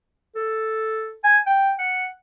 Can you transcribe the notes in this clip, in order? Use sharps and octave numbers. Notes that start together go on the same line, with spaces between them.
A4
G#5
G5
F#5